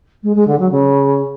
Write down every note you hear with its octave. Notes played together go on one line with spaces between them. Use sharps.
G#3
G#3
D3
F#3
C#3